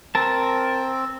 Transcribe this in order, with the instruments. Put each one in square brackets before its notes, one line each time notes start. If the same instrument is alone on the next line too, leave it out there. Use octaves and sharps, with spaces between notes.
[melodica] C4 [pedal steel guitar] A#4 A5